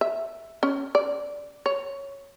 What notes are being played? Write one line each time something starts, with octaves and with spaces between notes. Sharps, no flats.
E5
C#4
D5
C#5